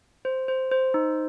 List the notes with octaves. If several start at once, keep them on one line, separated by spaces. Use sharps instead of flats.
C5
C5
C5
D#4